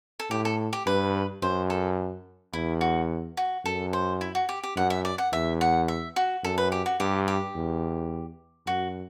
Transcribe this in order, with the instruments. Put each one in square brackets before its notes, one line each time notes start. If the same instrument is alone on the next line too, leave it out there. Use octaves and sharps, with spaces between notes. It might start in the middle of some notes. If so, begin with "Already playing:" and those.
[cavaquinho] A4
[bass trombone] A2 [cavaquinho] G4
[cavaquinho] A4
G4
[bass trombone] G2 [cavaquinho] B4
[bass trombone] F#2 [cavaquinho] C5
[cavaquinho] A4
[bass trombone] E2 [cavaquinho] E4
[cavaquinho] F#4
F#4
[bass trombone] F#2 [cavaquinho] A4
[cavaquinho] C5
E4
F#4
G4
G4
[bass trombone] F#2 [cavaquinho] F#5
[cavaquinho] E5
D5
F#5
[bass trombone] E2 [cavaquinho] E5
[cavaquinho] F#5
E5
F#4
[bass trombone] F#2 [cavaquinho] A4
[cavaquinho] B4
G4
F#4
[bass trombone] G2 [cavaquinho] G4
[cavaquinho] G4
[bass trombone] E2
[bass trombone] F#2 [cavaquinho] F#4